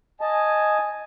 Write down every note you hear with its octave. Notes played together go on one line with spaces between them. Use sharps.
D#5 G#5 A5